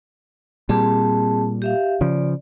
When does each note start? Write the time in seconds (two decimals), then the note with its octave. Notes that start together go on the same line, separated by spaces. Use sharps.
0.69 A#2 G3 C4 G#4 A5
1.62 G4 E5 F5
2.01 C#3 F3 D5